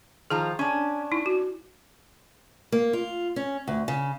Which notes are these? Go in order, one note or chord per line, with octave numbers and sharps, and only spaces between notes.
D#3 F3 G#4 A#5
C#4 D4
D#4 E4
F#4
A#3
F4
C#4
D2
C#3